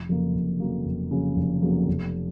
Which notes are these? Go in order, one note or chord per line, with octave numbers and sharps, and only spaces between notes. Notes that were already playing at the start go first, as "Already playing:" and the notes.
Already playing: F1
F2 C#3 F#3 A#3
F1
F2 C#3 F#3 A#3
F1
F2 C#3 F#3 A#3
F1
F2 C#3 F#3 A#3
F1